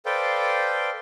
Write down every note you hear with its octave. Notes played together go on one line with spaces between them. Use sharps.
A4 B4 C5 D5 F5 G5